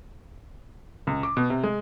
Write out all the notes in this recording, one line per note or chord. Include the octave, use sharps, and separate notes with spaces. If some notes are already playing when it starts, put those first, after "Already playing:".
C#2
D6
B2
C3
G#3